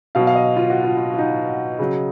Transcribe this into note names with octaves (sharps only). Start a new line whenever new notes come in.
B2 F#3 F5
F5
D#5
F4
F#4
F4
F4
F4
D#4
C#3 F#3